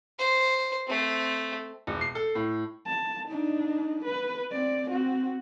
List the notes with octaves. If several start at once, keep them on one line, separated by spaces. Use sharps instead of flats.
C5
A3 C4
E1
C7
A4
A2
A5
D4 D#4
B4
C4 D5
C4 F#4